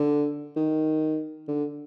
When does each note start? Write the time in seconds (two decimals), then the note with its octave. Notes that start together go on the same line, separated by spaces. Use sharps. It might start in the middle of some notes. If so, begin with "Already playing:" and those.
Already playing: D3
0.56 D#3
1.48 D3